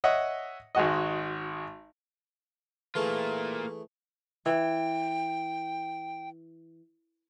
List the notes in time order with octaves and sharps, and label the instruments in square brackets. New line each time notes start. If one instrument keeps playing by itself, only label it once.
[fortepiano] C#5 D#5 E5 F#5
G#1 G#3 F#4 D#5
[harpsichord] E3 A3 G#4 [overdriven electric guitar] A#3 F4
[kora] E3 [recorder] G5